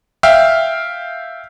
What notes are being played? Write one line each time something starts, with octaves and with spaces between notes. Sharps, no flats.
E5 F5 G5 F6